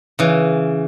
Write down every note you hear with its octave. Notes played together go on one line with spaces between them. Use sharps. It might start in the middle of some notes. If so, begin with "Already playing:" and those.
C#3 E3